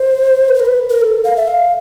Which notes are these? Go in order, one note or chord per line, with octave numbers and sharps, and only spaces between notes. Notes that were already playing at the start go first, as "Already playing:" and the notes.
Already playing: C5
B4
C5
A#4
B4
A#4
A4
F5
E5
F5